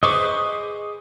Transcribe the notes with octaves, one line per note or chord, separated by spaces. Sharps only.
G#4 B4 C5 D#5 C#6 D6